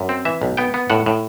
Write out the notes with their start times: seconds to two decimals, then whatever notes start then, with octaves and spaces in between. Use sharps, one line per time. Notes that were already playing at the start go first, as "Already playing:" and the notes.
Already playing: F#2
0.09 C4
0.25 E3 E5
0.42 B1
0.57 B3 G5
0.74 B3
0.90 A2 F#5
1.06 A2